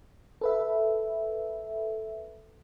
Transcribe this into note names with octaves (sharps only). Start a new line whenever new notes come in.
A4 B4 E5